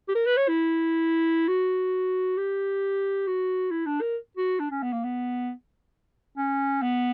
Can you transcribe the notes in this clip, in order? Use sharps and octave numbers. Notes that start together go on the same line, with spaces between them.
G4
A#4
B4
C#5
E4
F#4
G4
F#4
E4
D4
A#4
F#4
D4
C#4
B3
A#3
B3
C#4
B3